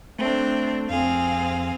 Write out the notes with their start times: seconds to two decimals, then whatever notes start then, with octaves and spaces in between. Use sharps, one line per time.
0.19 A3 C4 D4
0.90 F2 C4 G#4 F5